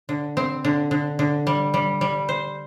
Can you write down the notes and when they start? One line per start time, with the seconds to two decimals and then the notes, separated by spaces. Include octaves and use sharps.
0.09 D3
0.37 C4
0.64 D3
0.91 D3
1.19 D3
1.47 G3
1.74 G3
2.01 G3
2.29 C5